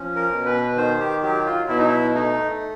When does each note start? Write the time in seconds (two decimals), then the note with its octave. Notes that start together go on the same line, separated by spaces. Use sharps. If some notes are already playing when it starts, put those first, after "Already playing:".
Already playing: F3 C#4
0.16 A#4
0.31 B2
0.45 B4
0.77 D#3 C5
1.00 G4
1.23 F#3 G4
1.46 F4
1.68 B2 E4
1.78 D#4
1.88 E4
2.15 A3 D#4